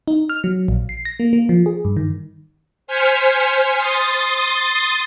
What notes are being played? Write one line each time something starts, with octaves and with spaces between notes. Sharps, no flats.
D#4
F6
F#3
A#1
C7
A#6
A#3
A#3
F3
G#4
G2
D#3
C5 G#5 F6 B6 C#7
C6 D#6 A6